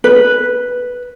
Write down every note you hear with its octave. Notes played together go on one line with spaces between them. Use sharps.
B4